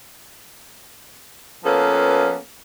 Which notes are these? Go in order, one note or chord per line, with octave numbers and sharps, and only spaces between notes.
F3 A#3 B3 C#4 A4 B4